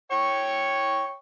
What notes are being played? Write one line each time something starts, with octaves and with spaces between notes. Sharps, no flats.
C#5 G5 C#6